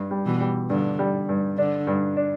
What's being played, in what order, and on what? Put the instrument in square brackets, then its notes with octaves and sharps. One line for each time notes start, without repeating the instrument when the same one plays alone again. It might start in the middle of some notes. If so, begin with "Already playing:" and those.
Already playing: [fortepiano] G2
G3
[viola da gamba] B2 E3
[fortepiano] G3
[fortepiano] G2 [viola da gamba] D3
[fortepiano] G3
G2
[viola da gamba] D3 [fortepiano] D4
[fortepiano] G2
D4